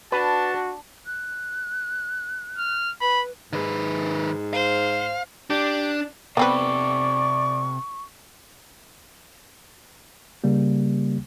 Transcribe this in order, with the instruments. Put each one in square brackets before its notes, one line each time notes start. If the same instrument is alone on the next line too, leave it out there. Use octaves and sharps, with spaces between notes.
[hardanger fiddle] D4 [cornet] F#4 [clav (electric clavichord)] B4 [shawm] A5
[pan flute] F#6
[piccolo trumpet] F6
[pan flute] B4 [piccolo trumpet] B5
[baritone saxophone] G#2 [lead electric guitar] D#3 B4
[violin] C5 [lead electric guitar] F5
[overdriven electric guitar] D4 [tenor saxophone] G4
[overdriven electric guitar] C3 A4 [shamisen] B3 C4 B4 [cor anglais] D5 [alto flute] C#6
[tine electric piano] C#3 G3 A#3